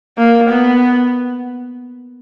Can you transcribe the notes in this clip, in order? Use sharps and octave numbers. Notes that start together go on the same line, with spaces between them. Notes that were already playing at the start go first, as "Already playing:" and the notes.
A#3
B3